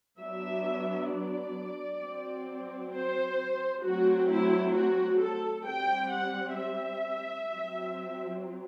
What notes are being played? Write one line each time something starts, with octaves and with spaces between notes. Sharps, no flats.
F#3 B3 D4 E5
D5
F#3 C4
C5
F#3 A3 C4 F#4
E4
F#4
A4
G3 C4 G5
F#5
E5
F#3 C4